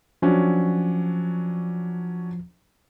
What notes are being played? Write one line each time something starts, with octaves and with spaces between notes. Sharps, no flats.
F3 F#3 C#4 D4